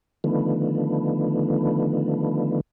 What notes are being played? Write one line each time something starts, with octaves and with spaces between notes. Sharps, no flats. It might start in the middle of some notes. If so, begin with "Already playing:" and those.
D3 D#3 F3 A3 B3